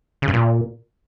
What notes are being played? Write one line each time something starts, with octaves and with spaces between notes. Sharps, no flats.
C#3
G2
A#2